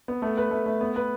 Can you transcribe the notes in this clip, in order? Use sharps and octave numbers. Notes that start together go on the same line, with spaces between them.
B3
A3
B4
A3
A3
B3
B4